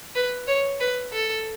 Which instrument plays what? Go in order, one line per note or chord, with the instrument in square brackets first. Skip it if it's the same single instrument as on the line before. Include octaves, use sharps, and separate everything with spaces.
[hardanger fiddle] B4
C#5
B4
A4